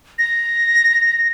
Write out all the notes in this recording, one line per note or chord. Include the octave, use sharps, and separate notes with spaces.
A#6